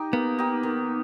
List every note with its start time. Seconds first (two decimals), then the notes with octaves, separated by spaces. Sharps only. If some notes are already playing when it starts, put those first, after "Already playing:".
Already playing: D#4 G4
0.13 A#3 B3
0.39 D#4 G4
0.63 D#3